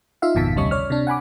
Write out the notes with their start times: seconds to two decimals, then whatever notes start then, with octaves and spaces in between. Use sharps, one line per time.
0.22 D#4 F4 E5 F5
0.35 G#1 F2 B2 D#3 A5 B6
0.56 D2 C3 G3 C#4 D#5 C#6
0.71 C#5 D5 F6
0.90 C3 D4
1.07 F#5 G#5 B5 D6